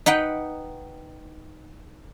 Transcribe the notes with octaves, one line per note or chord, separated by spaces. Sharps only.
D#4 B4 F#5 G5